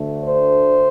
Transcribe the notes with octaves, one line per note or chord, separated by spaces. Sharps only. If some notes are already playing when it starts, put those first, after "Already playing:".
Already playing: D2 D3 A3
C5